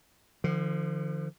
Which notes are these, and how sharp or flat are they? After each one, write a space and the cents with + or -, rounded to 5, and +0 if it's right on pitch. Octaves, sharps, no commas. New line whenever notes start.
D3 +40 F3 -15